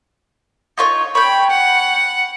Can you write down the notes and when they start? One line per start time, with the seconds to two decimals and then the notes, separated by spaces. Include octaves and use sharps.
0.78 D#4 F4 C#5
1.15 C#5 G5 B5
1.50 F#5